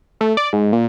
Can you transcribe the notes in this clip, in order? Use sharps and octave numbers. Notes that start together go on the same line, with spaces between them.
A3
D5
G#2
A#2